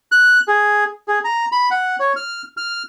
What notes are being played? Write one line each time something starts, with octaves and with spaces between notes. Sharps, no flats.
F#6
G#4
G#4
A#5
B5
F#5
C#5
F6
F6